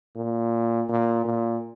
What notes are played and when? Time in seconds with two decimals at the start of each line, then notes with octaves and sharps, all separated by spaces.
0.16 A#2
0.89 A#2
1.25 A#2